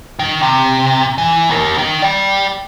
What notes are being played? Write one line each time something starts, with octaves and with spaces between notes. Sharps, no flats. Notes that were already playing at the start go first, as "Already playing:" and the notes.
D#3
C3
E3
D#2 A#4
D#3
D5 G5